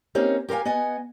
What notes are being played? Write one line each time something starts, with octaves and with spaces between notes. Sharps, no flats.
A#3 C4 C#4 D#4 G4 A#4
G4 A#4 B4 F5 G#5
B3 D#5 F#5 G#5